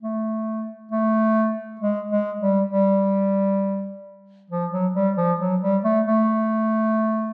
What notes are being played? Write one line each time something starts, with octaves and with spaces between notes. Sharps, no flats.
A3
A3
G#3
G#3
G3
G3
F3
F#3
G3
F3
F#3
G3
A3
A3